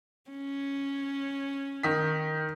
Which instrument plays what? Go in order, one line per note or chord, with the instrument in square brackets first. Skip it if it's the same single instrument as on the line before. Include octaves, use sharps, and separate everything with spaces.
[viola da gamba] C#4
[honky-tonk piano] D#3 B6